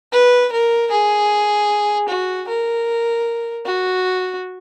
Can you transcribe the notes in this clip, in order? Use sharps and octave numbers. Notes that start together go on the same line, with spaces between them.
B4
A#4
G#4
F#4
A#4
F#4